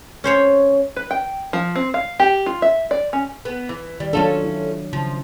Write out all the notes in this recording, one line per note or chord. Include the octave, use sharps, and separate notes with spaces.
C#4 C5 C#5
B4
G5
F3
C4
F5
G4
F4
E5
D5
C#4
B3
E3
D#3 G3
F#3 C#4 D4 F4 A4
E4
C#3 F3